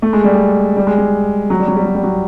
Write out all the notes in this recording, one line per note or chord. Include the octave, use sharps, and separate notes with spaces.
A3
G#3
G3
G#3
G3
G#3
G3
F#3
G3
F#3
G3
F#3
G3
F#3